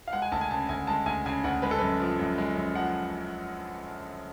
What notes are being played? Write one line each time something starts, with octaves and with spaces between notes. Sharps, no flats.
F5
G#3 F#5
G#5
D2 A5
G#5
C#3 A5
D2 G#5
G#3 A5
D2 G#5
C#3 G#5
D2 F#5
G#3 B4
A4
F#2 B4
F3
F#2
G#3
F#2
F3 F#5